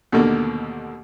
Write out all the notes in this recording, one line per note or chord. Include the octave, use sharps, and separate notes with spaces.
D#2 B2 D3 A3 A#3